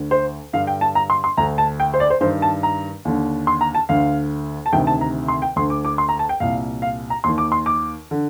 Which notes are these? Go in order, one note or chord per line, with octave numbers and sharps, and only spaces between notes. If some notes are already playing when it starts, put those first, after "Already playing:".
Already playing: D2 D3
C5
G2 D3 F5
G5
A5
A#5
C6
C6
D2 D3 A#5
A5
G5
C5
D5
C5
G2 D#3 C5
A5
A#5
D#2 D3
C6
A#5
A5
D2 D3 F5
A5
D2 C3 D#3 G5
A5
A#5
C6
G5
D2 D3 C6
D6
D6
C6
A#5
A5
G5
C2 A#2 F5
F5
A#5
D#2 D#3 C6
D6
C6
D6
D3